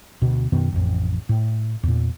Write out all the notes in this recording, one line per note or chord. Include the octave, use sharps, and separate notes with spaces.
D2 B2
F#2 B2 D#3 B3
A1 F2
A2
E2 A#2